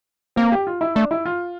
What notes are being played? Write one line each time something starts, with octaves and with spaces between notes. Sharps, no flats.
A#3 C4
G4
F4
E4
A3 D4
E4
F4